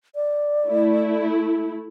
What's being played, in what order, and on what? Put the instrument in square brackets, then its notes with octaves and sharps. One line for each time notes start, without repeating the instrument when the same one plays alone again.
[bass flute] D5
[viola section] A3 E4